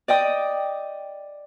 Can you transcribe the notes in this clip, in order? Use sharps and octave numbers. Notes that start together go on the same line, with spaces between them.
D5 D#5 G5 D#6